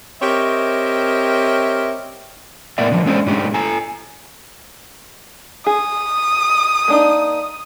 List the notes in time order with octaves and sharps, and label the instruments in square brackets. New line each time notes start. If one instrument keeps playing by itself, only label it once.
[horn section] C4 G4 A#4 C#5 D#5 E5
[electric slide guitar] A2 B3 A#4 D5 E5
D3 F3
G#3 C#4 D4 A4 C5
G#2 A3 D4 G4
A4 G#5 A#5
[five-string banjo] G#4 [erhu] D#6
[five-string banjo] A#3 D4 D#4